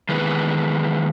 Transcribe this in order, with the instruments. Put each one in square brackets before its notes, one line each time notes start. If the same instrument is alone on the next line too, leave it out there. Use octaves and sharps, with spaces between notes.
[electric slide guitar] D#3 E3 G#3 B3 B4